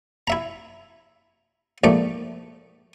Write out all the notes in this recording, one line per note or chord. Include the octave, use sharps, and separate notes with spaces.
E4 E5 A#5
A#1 G#2 A3 D5